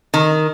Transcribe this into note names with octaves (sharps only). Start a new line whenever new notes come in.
D#3